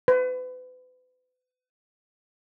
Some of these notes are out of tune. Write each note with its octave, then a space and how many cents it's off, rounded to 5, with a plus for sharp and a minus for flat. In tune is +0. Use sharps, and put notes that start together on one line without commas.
B4 +40